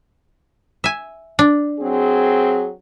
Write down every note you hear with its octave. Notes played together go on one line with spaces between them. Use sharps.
E5 G#5
D4
F#3 C4 G#4